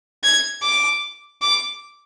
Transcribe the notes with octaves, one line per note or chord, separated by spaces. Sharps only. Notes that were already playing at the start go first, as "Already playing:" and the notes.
G#6
D6
D6